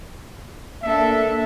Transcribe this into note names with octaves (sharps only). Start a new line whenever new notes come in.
A#3 D4 A4 E5